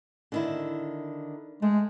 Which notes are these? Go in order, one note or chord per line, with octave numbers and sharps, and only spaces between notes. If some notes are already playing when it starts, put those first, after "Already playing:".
D3 D#3 E4
G#3 A3